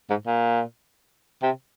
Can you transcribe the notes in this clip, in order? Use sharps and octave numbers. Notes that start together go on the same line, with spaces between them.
G#2
A#2
C3